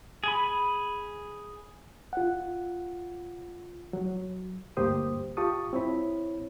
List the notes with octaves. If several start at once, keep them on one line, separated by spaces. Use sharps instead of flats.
G#4 G#5 B5
F4 F#5
F#3
D2 G2 A#3 G4 C5 D#6
F4 G4 A5 C#6 D#6
C4 E4 C#5 B5